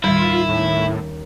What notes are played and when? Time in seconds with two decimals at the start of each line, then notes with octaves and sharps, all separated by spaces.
0.04 D#2 A2 D#3 G3 E4 F4
0.49 A2 A#3 C#4